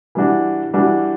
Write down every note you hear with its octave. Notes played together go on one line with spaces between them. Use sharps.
E3 G3 D4 F#4
E3 G3 D4 F#4